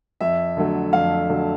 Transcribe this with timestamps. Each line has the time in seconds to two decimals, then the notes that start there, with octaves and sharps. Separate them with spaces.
0.21 F2 E5
0.57 D3 F#3 A3
0.93 F2 F5
1.30 D3 F#3 A3